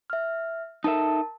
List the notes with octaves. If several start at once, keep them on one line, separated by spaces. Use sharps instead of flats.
E5 F6
D#4 A4 A#4 E5 A5